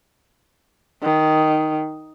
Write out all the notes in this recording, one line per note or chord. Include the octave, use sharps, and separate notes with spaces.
D#3